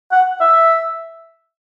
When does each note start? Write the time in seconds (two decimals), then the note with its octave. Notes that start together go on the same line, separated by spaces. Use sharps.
0.12 F#5
0.41 E5